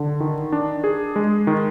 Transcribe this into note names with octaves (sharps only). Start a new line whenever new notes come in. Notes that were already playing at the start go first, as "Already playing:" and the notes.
Already playing: D3
D#3
D4
G#4
G#3
D#3